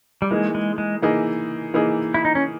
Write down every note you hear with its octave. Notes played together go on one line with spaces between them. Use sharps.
G3
E3 G#3 A#3 D#4 G#4
G#3
G#3
E3 A#3 D#4 G#4
E3 A#3 D#4 G#4
E4
D#4
C#4